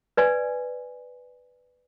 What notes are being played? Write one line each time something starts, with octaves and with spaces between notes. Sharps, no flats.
B4 D5 G#5